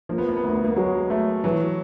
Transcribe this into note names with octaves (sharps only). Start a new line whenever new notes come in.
F3 A#3
B3
A#3
B3
D2 A#3
B3
A#3
F#3 G#3
A3
E3 F#3